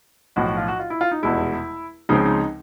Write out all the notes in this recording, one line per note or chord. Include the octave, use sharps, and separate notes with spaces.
B1 A2 F3 F#4
F#4
F4
F#4
F4
E4
F4
D#4
F1 E2 B2 G#3 E4
C#2 C#3 F3 G#3 C4 D#4
D#4